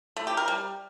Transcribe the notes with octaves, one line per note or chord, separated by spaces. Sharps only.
A3
G4
A#4
G3